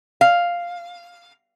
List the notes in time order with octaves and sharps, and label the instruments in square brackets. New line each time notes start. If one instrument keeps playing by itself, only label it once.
[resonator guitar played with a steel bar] F5